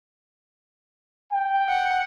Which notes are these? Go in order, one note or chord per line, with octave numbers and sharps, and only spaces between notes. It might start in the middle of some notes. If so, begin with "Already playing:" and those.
G5
F#5